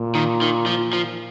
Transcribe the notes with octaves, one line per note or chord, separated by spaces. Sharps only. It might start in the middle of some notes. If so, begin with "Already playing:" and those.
Already playing: A#2
D#3
D#3
F3
F3